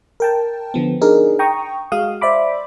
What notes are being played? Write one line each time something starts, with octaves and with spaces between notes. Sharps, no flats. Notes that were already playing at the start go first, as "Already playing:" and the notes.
A#4 G5 A5
D3 F3 B3
D4 D#4 G#4 A#4
G5 A#5 C#6 D#6
G#3 F#4 F5 D#6
C5 D5 E5 B5 D6